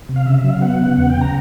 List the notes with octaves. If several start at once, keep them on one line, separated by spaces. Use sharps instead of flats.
C3
F5
C#3 E5
E5
F#3
F5
B3 F#5
C#3
E2 F#5
G5
C#3
A#5